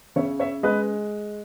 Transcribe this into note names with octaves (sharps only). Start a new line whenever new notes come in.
C#3 C#5 E5
C#5 E5
G#3 B4 D#5